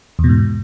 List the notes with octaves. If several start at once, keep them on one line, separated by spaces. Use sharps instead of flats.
E2
B2
G#2